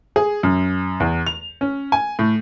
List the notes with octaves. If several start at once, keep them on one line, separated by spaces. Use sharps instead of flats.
G#4
F#2
E2
F7
C#4
G#5
A2